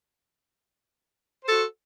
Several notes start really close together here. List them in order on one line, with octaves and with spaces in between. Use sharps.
C5 A4 F#4